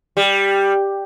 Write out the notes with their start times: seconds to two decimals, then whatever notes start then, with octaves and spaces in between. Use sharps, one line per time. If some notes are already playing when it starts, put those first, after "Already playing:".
0.17 G3